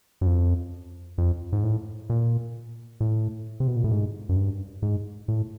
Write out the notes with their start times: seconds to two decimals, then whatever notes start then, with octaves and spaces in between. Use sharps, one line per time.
0.21 F#2
0.26 F2
1.18 F2
1.53 G#2
1.63 A2
2.10 A#2
3.00 A2
3.60 C3
3.67 B2
3.76 A#2
3.84 A2
3.91 G#2
4.29 F#2
4.36 G2
4.82 G#2
5.28 A2